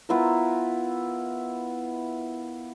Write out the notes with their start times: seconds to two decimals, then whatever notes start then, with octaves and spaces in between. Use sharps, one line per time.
0.09 B3 E4 F4 A#4